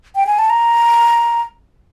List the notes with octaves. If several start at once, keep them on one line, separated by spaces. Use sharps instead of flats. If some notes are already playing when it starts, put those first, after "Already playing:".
G5
G#5
A5
A#5